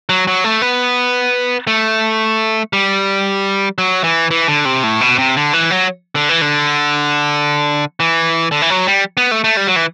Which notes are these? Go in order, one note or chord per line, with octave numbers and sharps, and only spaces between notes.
F#3
F#3
A3
B3
A3
G3
F#3
E3
E3
D3
C3
A2
B2
C3
D3
E3
F#3
D3
E3
D3
E3
D3
E3
F#3
G3
B3
A3
A3
G3
F#3
E3